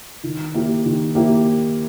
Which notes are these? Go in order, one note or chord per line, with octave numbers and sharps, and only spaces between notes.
D#3
A#3 E4 G4
D#3
A#3 E4 G4